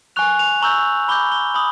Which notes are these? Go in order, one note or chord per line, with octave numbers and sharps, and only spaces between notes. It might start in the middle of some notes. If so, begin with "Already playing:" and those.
G#5 C#6 F#6 F7
F7
A#5 C#6 E6 G6 F#7
B5 D6 G6 G7
G7
B5 D#6 F#7